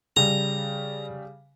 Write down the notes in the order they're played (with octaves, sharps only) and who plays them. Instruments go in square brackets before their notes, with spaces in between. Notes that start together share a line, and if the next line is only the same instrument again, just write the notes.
[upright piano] C#3 G3 [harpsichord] A#5